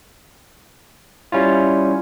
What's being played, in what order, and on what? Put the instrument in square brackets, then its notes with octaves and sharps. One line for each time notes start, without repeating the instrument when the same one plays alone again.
[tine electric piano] G3 C#4 E4 F4